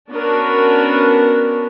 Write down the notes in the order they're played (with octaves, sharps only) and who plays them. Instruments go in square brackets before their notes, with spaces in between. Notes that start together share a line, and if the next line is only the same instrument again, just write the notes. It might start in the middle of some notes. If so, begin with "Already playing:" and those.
[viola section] B3 C#4 D4 F#4 A#4